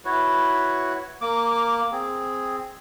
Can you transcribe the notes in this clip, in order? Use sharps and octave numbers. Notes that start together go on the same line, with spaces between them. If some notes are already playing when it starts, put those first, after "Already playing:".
E4 F#4 B4 C#5
A#3 D6
C4 G#4